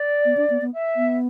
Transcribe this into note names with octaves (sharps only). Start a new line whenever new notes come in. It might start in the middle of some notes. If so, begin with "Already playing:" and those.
Already playing: D5
B3
D4
B3
B3
E5
B3